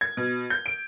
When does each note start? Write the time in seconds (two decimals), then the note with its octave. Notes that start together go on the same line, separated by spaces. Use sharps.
0.01 G#6
0.17 B2
0.50 G6
0.66 D7